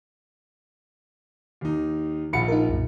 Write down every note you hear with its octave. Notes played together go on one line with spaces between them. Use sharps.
D#2 D#4
A#1 F4 F#5 B5 C#7
D#4 A#4
B1 F#2 A#2